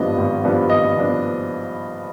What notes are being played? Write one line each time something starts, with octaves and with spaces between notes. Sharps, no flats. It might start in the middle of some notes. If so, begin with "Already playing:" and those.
Already playing: G#1 G2 F3 B3 D4 D#5
G#1
G2 F3 B3 D4
G#1 D#5
F3 B3 D4